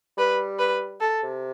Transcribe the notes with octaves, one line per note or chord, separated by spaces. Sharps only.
G3 B4
B4
A4
C3